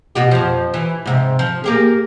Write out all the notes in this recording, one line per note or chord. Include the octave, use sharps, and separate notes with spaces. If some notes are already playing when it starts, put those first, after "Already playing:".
B2 F#4 G4
F2 F3
E3
G#2 C3
F3
A#3 G4 G#4